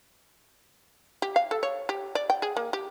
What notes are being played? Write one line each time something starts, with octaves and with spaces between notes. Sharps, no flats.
G4
F5
A4
C#5
G4
D5
G5
G#4
A#3
G4